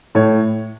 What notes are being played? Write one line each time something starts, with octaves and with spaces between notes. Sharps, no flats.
A2 C#5